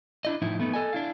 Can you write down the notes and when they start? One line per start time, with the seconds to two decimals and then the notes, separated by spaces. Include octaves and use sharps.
0.25 D4 E4 D#5
0.42 A2 F3 D#4 E4
0.60 A3 B3 D#4
0.74 A4 D#5 G#5
0.93 D4 E4 F5